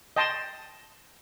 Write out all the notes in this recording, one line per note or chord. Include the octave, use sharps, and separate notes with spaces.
D#5 G5 A5 C6